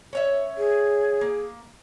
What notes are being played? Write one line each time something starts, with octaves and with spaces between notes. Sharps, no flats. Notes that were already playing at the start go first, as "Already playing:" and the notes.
C#4 C#5 E5
G#4
A#3